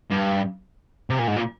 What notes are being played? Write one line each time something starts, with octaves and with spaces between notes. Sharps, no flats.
G2
C3
A#2
G#2
A#2